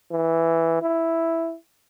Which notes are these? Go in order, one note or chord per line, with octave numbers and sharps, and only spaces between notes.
E3
E4